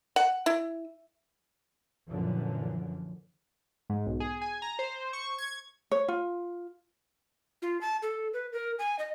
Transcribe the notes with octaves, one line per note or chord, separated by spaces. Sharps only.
F#5
E4
F#2 A#2 D3 E3 F3
G#2
B1
G#4
G#5
A#5
C5
C#6
G#6
C#5
F4
F4
A5
A4
B4
A#4
G#5
D#5